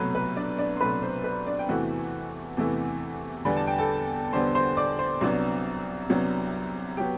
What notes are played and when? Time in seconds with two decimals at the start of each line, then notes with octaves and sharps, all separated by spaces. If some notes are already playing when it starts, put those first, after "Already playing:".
Already playing: C2 B2 F#3 A3 B4
0.15 B4
0.37 D4 D5
0.58 D4 D5
0.77 C6
0.81 C2 B2 F#3 A3 B4 B5
1.03 C5
1.24 B4
1.46 D4 D5
1.59 G5
1.69 E2 C3 E3 A3 E4 F#4 F#5
2.57 E2 C3 E3 A3 E4
3.45 E2 D3 G3 B3 B5
3.57 A5
3.67 G5
3.78 A4 A5
4.33 E2 D3 G3 B3 C5 C6
4.55 C5 C6
4.77 D5 D6
4.99 C5 C6
5.21 C2 C3 F#3 B3 D4
6.10 C2 C3 F#3 B3 D4
6.97 F#3 B3 G4 G5